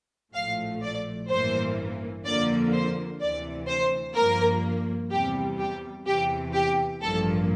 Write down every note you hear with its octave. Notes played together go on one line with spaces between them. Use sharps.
A#1 A2 F3 A3 F5
D5
A1 G2 E3 A#3 C5
F2 D3 F3 A#3 D5
C5
D2 C3 E3 D5
C5
G2 F3 A#3 A#4
E2 C3 G3 G4
G4
E2 C3 E3 G4
G4
A1 G2 F3 A#3 A4